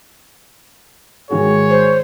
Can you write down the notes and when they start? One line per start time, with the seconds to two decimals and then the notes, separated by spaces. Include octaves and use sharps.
1.31 G#2 D#3 F#4 G#4 C#5
1.70 C5